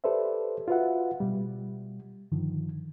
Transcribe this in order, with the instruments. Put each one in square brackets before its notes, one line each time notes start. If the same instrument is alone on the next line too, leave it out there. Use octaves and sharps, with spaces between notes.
[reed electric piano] G4 A4 B4 C5 D5 E5
F4 F#4 B4 E5 F#5
B2 G3
G2 D3 D#3 F3